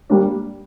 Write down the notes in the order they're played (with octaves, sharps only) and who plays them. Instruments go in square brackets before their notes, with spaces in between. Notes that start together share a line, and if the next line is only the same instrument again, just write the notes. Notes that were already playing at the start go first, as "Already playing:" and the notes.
[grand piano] G3 A#3 D4